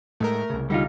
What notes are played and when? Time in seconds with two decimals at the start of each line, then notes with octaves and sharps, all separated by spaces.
0.20 A2 G#3 A3 A#4
0.50 C2 C#3
0.70 D3 G3 D#4 F4